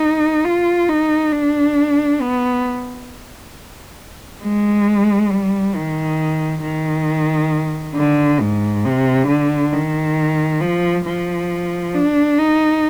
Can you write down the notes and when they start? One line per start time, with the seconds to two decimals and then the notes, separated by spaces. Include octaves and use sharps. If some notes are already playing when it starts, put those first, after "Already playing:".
Already playing: D#4
0.44 F4
0.89 D#4
1.32 D4
2.22 B3
4.43 G#3
5.31 G3
5.75 D#3
6.63 D#3
7.95 D3
8.41 G#2
8.85 C3
9.28 D3
9.73 D#3
10.61 F3
11.06 F3
11.94 D4
12.38 D#4